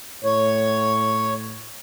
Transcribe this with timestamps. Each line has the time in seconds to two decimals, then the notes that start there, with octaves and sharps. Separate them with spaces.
0.24 A2 C#5